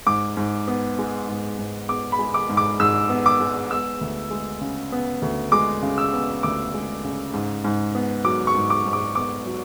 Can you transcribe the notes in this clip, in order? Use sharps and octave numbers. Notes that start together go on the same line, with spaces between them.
G#2 D6
G#2
B3
G#3
G#2
G#2
B3 D6
B5
G#3
D6
G#2
D6
G#2 E6
B3
D6
G#3
B3 E6
D2
G#3
C#3
B3
D2
G#3 D6
C#3
E6
B3
D2 D6
G#3
C#3
G#2
G#2
B3
F#3 D6
C#6
G#2
D6
G#2
D6
B3 D6
F#3